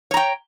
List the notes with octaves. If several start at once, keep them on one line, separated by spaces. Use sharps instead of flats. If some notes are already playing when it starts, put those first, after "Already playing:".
C#5 G5 A#5